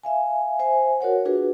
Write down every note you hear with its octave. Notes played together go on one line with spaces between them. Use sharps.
E5 F5 G#5
C5 E5 G#5
F#4 A#4 C#5 F#5
D4 F4 F#4 G#4 B4